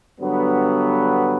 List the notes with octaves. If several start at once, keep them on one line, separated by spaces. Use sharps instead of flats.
G2 D3 F#3 B3